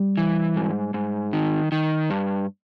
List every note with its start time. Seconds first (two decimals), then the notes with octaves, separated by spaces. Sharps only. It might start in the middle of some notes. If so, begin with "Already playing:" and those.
Already playing: G3
0.17 E3
0.57 G#2
0.94 G#2
1.33 D#3
1.72 D#3
2.10 G2